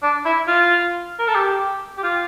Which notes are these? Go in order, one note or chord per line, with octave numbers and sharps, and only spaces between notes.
D4
E4
F4
A#4
A4
G4
G4
F4